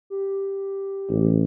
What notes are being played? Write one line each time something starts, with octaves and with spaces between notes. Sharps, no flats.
G4
A1